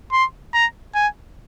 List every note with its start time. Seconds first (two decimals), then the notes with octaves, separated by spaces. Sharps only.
0.12 C6
0.53 A#5
0.95 G#5